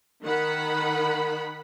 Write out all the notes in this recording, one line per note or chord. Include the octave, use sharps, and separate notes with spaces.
D#3 F#5 B5